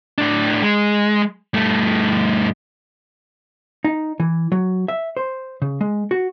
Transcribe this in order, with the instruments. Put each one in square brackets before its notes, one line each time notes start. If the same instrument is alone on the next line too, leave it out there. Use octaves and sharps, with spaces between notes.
[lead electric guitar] A2 D4
G#3
G2 A3
[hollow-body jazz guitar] D#4
E3
F#3
E5
C5
C#3
G#3
F#4